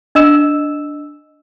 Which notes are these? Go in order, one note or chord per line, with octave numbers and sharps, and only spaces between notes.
D4 D#5 E6 E7